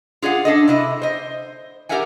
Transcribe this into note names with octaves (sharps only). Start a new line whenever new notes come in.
F4 G#4 D5 F#5
D4 A4 D#5
C3 E4 D#5
C5 D#5
G4 A#4 D5 E5 F#5 G#5